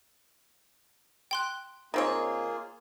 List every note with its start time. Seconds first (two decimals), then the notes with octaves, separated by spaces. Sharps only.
1.31 G5 C6 F#6
1.94 D#3 A#3 C4 F4 G#4 C#5